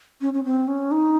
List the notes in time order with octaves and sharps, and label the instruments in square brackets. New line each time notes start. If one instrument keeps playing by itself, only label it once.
[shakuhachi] C#4
C#4
C4
C#4
D#4